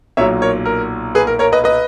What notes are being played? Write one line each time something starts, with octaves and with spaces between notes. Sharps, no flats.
B1 A#2 F#3 C#5 E5
A#4 C#5
A#4
G#4 B4
A#4
A#4 C#5
B4 D#5
B4 D#5